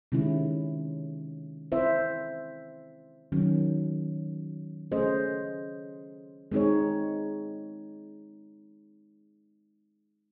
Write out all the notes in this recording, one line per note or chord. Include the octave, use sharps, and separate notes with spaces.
C3 D#3 G#3 C#4 E4
C4 E4 C5 E5
D#3 F#3 C#4
A3 C#4 G#4 C5 D#5
G#3 C4 D#4 G#4 C#5